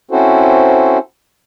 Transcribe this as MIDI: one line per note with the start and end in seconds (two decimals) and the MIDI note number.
0.11 0.98 60
0.11 0.98 61
0.11 0.98 64
0.11 0.98 66
0.11 0.98 69
0.11 0.98 72